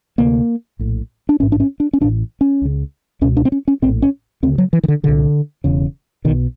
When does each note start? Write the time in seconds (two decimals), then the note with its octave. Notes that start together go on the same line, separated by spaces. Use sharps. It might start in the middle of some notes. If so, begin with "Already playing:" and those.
0.18 D2 C3 A#3
0.79 A#1 A2
1.29 D4
1.40 A1 G#2 C#4
1.52 D4
1.60 C#4
1.80 D4
1.93 C#4
2.01 A1 D4
2.04 A2
2.41 C#4
2.62 C#2 C#3
3.21 C#2 B2 C#4
3.37 D4
3.45 C4
3.52 C#4
3.68 C#4
3.82 A#1 A2 C4
4.02 C#4
4.43 D2 C#3 C4
4.58 F#3
4.73 E3
4.83 D#3
4.88 D3
5.03 C2 A#2 D3
5.64 E1 E2 C#3
6.25 B2 D#3
6.29 B1